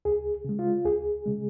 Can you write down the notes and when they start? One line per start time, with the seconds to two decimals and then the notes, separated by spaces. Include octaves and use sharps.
0.05 C#2 G#4
0.45 C#3 G#3
0.59 F4
0.85 C#2 G#4
1.26 C#3 G#3